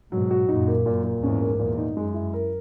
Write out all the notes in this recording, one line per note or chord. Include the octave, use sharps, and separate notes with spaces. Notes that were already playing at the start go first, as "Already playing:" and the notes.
G#2 B2 F#3
F#4
F#2 A#2 D#4
A#3
F#2 A#2
A#2
E2 G#2 C#4
A#3
E2 A#2
D#4
F#2 G#3
E4
A#4